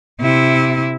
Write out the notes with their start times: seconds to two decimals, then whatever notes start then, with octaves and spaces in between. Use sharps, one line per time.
0.21 C3 E4